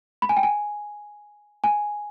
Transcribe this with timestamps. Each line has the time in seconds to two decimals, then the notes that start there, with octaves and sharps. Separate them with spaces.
0.22 B5
0.29 G#5
0.37 G5
0.43 G#5
1.64 G#5